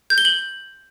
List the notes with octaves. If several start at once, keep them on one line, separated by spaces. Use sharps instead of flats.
G6
G7
F#7